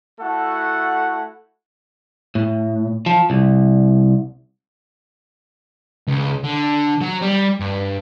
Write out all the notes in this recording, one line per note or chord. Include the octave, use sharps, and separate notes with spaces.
A3 E4 F#4 A4 F#5
A2
F3
C2
C#2
D3
F#3
G3
G2